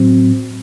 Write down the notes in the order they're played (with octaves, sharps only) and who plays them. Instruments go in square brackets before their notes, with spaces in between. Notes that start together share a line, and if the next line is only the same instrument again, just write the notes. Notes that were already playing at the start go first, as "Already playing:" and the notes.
Already playing: [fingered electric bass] A2 F#3 C4